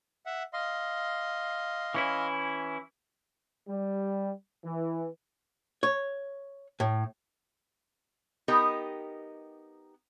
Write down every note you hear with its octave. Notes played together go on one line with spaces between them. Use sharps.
E5 F#5
D#5 F5 C6
E3 C#4 E4
G3
E3
C#5
A2
B3 D#4 G4 A#4 D#5